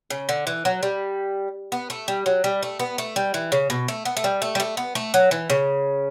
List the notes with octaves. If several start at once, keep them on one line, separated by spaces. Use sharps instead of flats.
C#3
D3
E3
F#3
G3
B3
A3
G3
F#3
G3
A3
B3
A3
G3
E3
C#3
B2
A3
B3
A3
G3
A3
G3
A3
B3
A3
F#3
E3
C#3